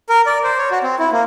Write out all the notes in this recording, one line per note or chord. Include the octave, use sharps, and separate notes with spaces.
A#4
D5
C5
C#5
F#4
C4
E4
A#3